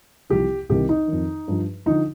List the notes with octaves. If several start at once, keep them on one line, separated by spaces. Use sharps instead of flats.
C2 C3 F3 G4
C2 C3 D#3 G4
D#4
F2 D#3
G2 F3
D3 F3 D#4